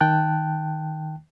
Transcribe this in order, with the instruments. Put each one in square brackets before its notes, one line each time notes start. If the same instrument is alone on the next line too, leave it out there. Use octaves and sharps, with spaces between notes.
[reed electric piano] D#3 G5 A5 F#6